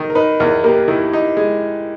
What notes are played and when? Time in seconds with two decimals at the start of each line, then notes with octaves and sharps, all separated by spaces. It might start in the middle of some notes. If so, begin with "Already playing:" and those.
Already playing: D#3
0.10 A#4
0.15 D#4 B4
0.40 E2 A#4
0.64 A#3 G4
0.88 D#3 E4
1.13 D#4
1.37 G#3